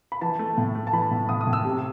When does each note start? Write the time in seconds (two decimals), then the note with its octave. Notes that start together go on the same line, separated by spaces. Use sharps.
0.12 B5
0.21 E3 A5
0.39 A3
0.57 A2
0.75 A3
0.87 A5
0.93 E3 B5
1.11 A2
1.29 A2 D#6
1.41 D#6
1.47 A2
1.53 E6
1.65 C3